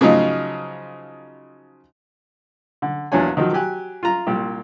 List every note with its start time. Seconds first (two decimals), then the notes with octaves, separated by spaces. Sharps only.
0.01 C#3 F3 F#3 D#4 F4
2.82 D3
3.12 A#1 E2 F#3 D4 C#5 G#5
3.37 D#3 F3 F#3
3.53 F#3 G4 G#5 F#6
4.03 F4 A#5
4.27 C2 A#2 G4